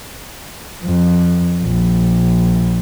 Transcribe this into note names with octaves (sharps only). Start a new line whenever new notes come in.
F2
A#1